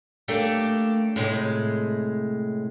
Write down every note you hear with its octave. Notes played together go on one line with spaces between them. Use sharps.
A3 A#3 D4 G4
A2 C3 G#3